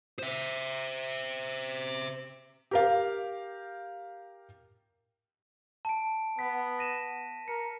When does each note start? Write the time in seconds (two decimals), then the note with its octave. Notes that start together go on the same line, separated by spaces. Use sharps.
0.19 C5 E5
2.71 G4 A#4 F5
5.85 A5 D7
6.39 B3 B6
6.79 A#6 D#7 E7
7.48 A#4 C#7